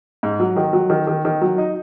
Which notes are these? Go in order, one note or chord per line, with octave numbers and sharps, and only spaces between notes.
G#2
F#3
D#3
F#3
D#3
D#3
D#3
F#3
D#4